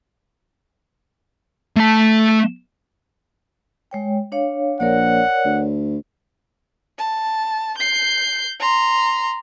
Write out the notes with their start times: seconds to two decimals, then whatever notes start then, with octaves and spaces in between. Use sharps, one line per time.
1.77 A3 A5
3.91 G#3 C#5 G5
4.32 D4 C#5 F5
4.80 A#1 A#4 C#5 D5 F#5
5.45 D2
6.99 A5
7.78 G6 C7
8.60 A#5 C6